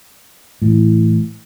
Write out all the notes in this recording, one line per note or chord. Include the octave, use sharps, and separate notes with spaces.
A2 E3